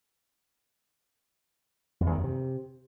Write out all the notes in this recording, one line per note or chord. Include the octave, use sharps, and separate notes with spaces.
F2
E2
D#3
F#2
C3